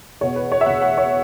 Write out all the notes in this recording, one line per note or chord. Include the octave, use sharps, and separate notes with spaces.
E2 B2 C#5
B4
C#5
E5
E2 B2 F#5
F#5
C#5